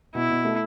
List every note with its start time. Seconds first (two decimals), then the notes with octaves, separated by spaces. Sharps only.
0.15 B2 E4
0.30 B2
0.45 A3